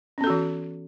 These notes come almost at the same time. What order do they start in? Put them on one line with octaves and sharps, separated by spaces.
C#4 B3 A4 F#4 E3